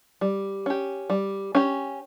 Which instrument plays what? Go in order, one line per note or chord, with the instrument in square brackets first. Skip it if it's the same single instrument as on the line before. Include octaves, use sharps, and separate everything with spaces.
[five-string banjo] G3
C#4 G4
G3
C#4 G4